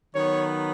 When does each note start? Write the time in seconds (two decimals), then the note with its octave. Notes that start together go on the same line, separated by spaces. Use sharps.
0.15 D#3 F#3 B3 C#5